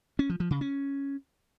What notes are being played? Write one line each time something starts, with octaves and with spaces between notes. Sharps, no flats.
C#4
F3
F3
C#3
C#4